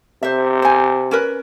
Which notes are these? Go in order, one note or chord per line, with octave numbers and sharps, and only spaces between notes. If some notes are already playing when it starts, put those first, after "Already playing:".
C3 C5 E5
C5 G#5
C#4 A#4 B4